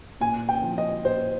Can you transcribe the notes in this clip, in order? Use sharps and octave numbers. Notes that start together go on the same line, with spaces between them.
A#2 G#5
G5
F3
D#5
A#2 C5